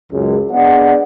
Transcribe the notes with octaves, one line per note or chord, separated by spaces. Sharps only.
C#2 F#2
B3 D4 G#4 D5 D#5 F#5